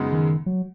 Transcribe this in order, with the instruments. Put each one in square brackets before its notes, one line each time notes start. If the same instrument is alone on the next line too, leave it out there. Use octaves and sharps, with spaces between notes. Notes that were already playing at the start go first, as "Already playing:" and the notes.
Already playing: [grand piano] F#2 C#3 G#3 B3 D#4
[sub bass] D#3
F#3